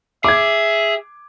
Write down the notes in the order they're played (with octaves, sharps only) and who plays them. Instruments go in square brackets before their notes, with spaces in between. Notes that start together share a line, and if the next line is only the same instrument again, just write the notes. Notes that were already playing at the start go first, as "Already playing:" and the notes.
[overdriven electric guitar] G#4 [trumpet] E5 [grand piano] D6 G#6